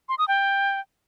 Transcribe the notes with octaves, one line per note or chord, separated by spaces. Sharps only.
C6
D#6
G5